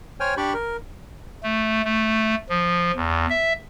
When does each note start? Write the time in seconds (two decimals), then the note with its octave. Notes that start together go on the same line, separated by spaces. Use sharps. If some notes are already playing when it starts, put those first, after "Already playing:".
0.20 C5 C#5 G5 G#5 F6
0.37 D4 G4 D5 B5 C#6
0.54 A#4
1.43 A3
1.85 A3
2.49 F3
2.96 E2
3.30 E5